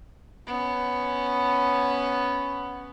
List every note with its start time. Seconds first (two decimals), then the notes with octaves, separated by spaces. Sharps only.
0.47 B3 C#4